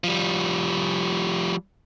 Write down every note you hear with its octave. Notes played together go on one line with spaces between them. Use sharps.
F3 G3